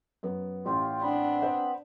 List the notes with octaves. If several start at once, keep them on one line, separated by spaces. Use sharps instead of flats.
F#2 B3
A1 F4 G4
B3 C4 D4 B5
C5